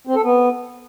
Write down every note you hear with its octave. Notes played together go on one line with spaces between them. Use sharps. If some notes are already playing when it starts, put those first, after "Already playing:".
C4
A4
B3